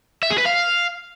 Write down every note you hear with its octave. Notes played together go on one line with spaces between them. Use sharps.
E5
G#4
B4
F5